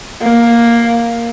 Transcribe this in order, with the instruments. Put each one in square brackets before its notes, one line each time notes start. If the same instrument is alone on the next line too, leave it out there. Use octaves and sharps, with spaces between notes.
[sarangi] A#3